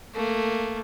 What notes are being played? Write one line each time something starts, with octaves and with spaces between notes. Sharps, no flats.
A3 A#3